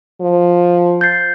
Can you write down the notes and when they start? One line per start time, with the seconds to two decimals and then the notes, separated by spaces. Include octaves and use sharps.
0.21 F3
1.01 G6 A6 C7